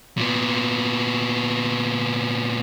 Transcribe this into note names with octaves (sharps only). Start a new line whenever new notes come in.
A#2 B3